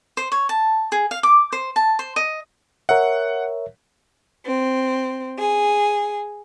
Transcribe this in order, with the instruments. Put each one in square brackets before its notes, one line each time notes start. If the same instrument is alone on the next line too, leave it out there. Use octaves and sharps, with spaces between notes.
[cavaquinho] C5
C#5
A5
G#4
F5
D6
C5
A5
C5
D#5
[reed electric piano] A#4 C#5 E5 [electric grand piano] F#5
[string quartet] C4
G#4